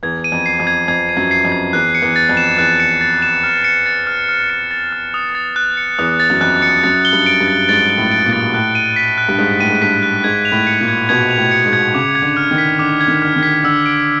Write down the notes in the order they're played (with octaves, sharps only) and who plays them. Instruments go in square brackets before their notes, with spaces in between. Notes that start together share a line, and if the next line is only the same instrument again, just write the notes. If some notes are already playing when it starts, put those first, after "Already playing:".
[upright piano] E2 [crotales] G#6
[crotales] D#7
[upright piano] F2
[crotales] C7
[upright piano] F2
[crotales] G#6
[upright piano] F2 [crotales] G#6
[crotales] D#7
[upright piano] F#2
[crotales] C7
[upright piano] F2
[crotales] G#6
[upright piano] E2 [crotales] F#6
[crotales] C#7
[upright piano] E2
[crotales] A6
[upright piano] F2
[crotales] E7
[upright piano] E2 [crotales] F#6
[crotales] C#7
A6
E7
F6
C#7
A6
F6
F6
C#7
A6
F6
D#6
A6
F#6
C#7
[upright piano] E2 [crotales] D#6
[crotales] A6
[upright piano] F#2
[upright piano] F2 [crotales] F#6
[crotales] C#7
[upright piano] F#2 [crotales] A6
[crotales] G7
[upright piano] G2
[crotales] D7
[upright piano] G2
[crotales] A6
[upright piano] G#2 [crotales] A6
[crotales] G7
[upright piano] A2
[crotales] D7
[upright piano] A#2
[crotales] A6
[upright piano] A2 [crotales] F#6
[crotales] D#7
B6
F#6
[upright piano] G2
[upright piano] G#2 [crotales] F#6
[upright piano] A2 [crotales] D#7
[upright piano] G#2
[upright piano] G2 [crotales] B6
[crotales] F#6
[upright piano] G#2 [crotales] G#6
[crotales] F7
[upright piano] A2
[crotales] C#7
[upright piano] A#2
[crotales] G#6
[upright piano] B2 [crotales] G#6
[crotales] F7
[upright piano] A2
[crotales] C#7
[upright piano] G#2
[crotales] G#6
[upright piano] C#3 [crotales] D6
[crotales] G#6
[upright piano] D3
[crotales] F6
[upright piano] D#3
[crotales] B6
[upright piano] D3 [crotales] D6
[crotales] G#6
[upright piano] D#3
[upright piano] D3 [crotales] F6
[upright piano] D#3
[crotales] B6
[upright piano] D3 [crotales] E6
[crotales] D7